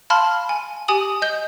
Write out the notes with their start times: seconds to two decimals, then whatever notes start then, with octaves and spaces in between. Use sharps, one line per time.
0.10 F5 A5 B5 C6 F6
0.49 G#5
0.88 G4 G#5 D#6 F#7
1.22 D#5 G6 G7